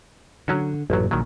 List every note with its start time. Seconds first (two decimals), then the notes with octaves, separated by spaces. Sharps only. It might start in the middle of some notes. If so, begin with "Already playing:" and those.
0.48 D3 D#3 F#3 C#4 F#4
0.90 A1 F#2 A#2 F#3
1.11 A#1 A#2 D#3 F#3